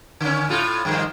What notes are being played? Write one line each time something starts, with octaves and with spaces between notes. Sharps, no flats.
D3 C#4
A2 F4 A4
G2 D#3 F3